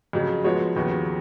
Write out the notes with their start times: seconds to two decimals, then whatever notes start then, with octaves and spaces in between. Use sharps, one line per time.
0.13 F2 C#3 F#3
0.44 F3 G#3 B3 F#4 C#5
0.76 D#2 C#3 F3 B3 F#4